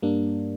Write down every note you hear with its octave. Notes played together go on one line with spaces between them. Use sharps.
G2 G3 A#3 D4